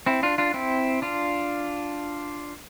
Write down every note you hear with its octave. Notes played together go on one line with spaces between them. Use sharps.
C4 E4
D4 F4
D4 F4
C4 E4
D4 F4